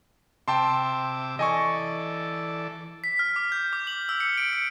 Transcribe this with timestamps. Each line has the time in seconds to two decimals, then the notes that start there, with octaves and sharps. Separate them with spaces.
0.48 C3 E5 G5 A5 C6 D6
1.39 E3 A4 D5 D#5 G#5 C#6
3.04 B6
3.19 F6
3.36 D6
3.52 G6
3.73 D6
3.87 F#7
4.09 E6
4.20 C#7
4.37 D7
4.53 C#7